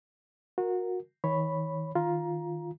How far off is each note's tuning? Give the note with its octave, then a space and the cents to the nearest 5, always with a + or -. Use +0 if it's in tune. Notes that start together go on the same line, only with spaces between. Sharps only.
F#4 -25 A#4 +0
D#3 +45 C#5 +0 B5 +0
D#3 +0 F4 +0 A#5 +15